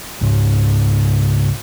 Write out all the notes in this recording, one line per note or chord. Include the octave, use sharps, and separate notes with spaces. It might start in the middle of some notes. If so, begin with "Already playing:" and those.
C#2 G#2 C#3